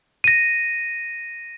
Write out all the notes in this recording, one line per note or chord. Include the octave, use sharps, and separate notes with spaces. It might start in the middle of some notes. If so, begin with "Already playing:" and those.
A#6 D#7